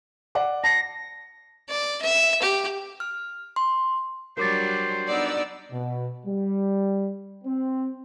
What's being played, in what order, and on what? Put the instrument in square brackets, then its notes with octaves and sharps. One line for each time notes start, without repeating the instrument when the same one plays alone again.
[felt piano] D5 F#5 D6
[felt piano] A5 C7 C#7 [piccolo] A#6
[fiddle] D5
E5
G4
[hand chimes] F6
C6
[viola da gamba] F#3 G3 D4 [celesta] A#4 D6 A6 [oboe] C5
[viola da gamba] B3 D4 D#4 [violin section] D5 F#5 E6
[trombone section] B2
G3
C4